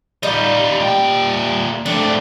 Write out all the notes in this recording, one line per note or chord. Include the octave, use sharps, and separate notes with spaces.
G3 D#4 F4
A#2 G5
A3 C4 D4